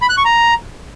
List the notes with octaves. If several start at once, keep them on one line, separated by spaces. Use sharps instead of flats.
B5
F#6
C#6
A#5